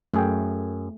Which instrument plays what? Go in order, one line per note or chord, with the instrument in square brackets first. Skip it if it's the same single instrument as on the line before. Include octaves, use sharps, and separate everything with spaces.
[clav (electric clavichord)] F#2 G#4 G5 [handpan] A3